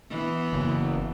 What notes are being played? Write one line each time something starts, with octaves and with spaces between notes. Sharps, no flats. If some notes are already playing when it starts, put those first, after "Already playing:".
E3 B3
F#1